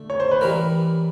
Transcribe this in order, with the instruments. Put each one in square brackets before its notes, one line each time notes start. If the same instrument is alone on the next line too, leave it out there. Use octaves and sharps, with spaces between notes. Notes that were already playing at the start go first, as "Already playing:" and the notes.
Already playing: [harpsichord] D3 A3
[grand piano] C#5
C5
B4
[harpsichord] E3 G3 [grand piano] A#4